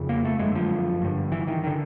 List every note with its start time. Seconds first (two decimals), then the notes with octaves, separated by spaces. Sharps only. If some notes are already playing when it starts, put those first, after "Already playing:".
Already playing: F2 C#3
0.09 A#3
0.25 A3
0.39 F#2 D3 G#3
0.55 F3
1.01 G2 D3
1.32 E3
1.47 D#3
1.64 D3 D#3